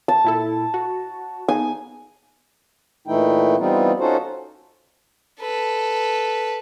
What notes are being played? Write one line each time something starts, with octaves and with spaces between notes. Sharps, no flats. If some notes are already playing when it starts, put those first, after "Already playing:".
A5
A#2 E4 A4
F#4
B3 D#4 G#4 G#5
A#2 E3 A3 D#4 E4 G5
E3 G3 B3 C4 D#4 F4
C#4 D#4 F4 F#4 A4 C5
A4 B4